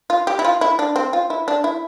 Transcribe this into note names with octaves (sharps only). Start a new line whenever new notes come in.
F4
G4
E4
F4
E4
D4
C4
F4
E4
D4
E4